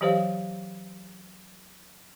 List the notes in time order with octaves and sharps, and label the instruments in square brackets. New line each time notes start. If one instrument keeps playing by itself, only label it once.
[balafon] E3 F#3 G4 C5 C#5 F5